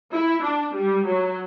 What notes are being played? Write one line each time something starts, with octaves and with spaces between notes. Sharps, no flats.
E4
D4
G3
F#3